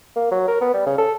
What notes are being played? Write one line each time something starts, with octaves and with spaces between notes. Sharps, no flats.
A#3
F#3
A#4
B3
G3
C#3
A4